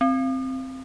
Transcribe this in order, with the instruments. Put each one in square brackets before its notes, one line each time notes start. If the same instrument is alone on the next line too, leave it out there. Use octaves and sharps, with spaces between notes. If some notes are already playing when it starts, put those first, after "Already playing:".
[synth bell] C4